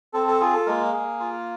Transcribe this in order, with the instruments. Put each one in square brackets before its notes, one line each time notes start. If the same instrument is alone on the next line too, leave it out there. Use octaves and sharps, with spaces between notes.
[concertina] C4 A4
A4
F4 G#4
A4
G#3 A#3 A#4
G#4
F4